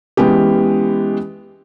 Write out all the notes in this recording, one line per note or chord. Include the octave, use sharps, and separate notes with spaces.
E3 G#3 B3 C#4 G4